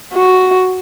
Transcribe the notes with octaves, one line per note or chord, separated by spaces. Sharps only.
F#4